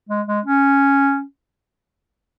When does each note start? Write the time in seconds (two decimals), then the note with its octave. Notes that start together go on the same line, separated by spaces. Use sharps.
0.09 G#3
0.27 G#3
0.45 C#4